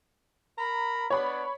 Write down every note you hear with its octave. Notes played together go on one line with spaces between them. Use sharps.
A#4 A#5 B5
B3 D4 C#5 B5